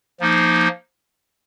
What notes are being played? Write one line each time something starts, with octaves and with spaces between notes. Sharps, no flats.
F3 A#3 D#4